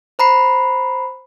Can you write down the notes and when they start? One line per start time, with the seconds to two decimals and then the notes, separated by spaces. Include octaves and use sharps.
0.19 C5 A#5 B5 C7